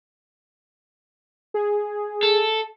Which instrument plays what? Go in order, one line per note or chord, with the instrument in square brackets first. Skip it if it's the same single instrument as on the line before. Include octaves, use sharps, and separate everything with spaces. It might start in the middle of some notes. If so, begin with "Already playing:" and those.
[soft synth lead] G#4
[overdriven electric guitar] A4